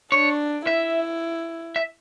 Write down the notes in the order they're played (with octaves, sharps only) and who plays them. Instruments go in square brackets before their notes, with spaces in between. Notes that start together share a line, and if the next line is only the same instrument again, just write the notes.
[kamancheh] D4 [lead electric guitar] C#5
[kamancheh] E4 [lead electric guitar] E5
[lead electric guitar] E5